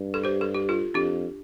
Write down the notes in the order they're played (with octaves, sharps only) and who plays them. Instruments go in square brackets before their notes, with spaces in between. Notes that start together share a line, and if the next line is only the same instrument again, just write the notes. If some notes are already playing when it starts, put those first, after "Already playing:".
Already playing: [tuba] G2
[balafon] A4
G4 C5
A4
G4
F4 A4
[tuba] F2 [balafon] D4 G4